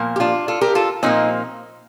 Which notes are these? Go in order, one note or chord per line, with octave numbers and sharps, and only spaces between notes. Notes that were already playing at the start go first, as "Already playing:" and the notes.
Already playing: A#2 F3 A#3
G4
D4 F4
F4 A4
G4 A#4
F4 A4
A#2 F3 A#3 C4 D#4